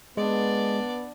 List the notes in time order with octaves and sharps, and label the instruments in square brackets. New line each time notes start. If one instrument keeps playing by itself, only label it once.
[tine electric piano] G#3 [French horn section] B3 [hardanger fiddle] D4 D5